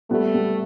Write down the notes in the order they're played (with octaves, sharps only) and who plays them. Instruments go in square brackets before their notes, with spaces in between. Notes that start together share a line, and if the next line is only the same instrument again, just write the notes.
[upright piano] G3 B3 [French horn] A3
[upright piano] G3 B3